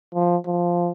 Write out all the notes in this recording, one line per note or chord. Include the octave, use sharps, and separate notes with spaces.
F3
F3